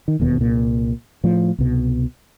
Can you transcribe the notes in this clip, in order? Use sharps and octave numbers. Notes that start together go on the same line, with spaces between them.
D#3
E1 D#2 B2
C2 A#2
A2 F3
C2 B2